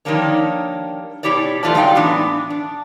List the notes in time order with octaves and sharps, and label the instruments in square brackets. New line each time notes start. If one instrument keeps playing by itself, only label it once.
[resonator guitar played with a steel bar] D#3 F3 G3 A#3 D4 C#5
B2 G#3 E4 G4 C#5 D5
E2 A3 F4 B4 D5 A5
F#3 G#3 D4 D#4 F5 G5
A2 E3 B3 D4
D4